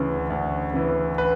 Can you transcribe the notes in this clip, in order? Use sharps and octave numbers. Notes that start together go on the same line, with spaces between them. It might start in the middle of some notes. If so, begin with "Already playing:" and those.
Already playing: D2 C#3 E3
D2
C#3 E3
B4